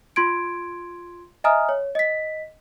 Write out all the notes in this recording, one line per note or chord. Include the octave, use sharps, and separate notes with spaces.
F4 C6 G#6 D7
D#5 E5 G#5 A#5 D#6 F6
C#5
D#5 B6